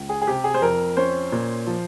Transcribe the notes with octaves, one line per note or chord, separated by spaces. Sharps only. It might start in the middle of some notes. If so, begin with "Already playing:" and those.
Already playing: C#2
G#4
G#4
C3 G4
G#4
C5
F2 A#4
C#4 C5
A#2
F3